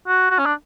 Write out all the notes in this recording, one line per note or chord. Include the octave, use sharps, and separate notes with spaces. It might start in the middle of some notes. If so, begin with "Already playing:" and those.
F#4
F#4
C#4
D4